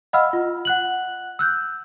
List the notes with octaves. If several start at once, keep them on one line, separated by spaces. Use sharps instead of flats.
D#5 F5 F#5 B5 E6 F6
F4
F#5 F#6 F#7
E6 F#6 G6